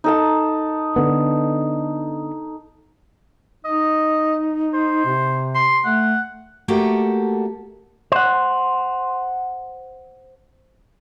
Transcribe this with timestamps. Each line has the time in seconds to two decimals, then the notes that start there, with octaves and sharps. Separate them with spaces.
0.04 D#4 A4 A5
0.96 D3 B3
3.65 D#4 D#5
4.73 C5
5.06 C3
5.55 C6
5.85 A3 F#5
6.68 A3 A#3 F#4 G4 A4
8.12 C5 F#5